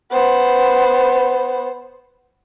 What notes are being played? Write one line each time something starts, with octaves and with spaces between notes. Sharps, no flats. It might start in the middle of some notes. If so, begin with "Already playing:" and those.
B3 C5